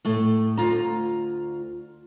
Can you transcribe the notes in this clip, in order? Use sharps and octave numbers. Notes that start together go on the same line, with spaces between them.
A2 A3
D2 F4 A#5